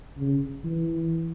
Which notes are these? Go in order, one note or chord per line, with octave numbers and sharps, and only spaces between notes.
C#3
E3